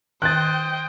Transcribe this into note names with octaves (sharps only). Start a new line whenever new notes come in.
D#3 C5 D#5 G5 F#6 A6